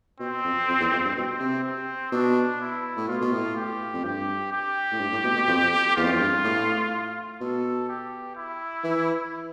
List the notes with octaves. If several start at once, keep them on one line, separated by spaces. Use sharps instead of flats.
B2 C4
F2
F2
E2
F2
G2
B2 C4
C3
C4
B2 D4
E4
A2
B2 F4
B2
A2
G4
F2
G2 G4
G4
A2
G2
A2
B2
B2
F2
E2 F4
F2
E2
G2
A2
B2 A4
G4
E4
E3